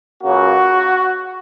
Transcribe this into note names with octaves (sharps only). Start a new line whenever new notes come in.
C#2 C#3 F#3 A#3 F#4